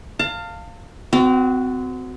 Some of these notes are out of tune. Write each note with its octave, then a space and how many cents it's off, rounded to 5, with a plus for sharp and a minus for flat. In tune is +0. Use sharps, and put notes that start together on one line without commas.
F5 +0 A5 +40
C4 -35 F#4 +0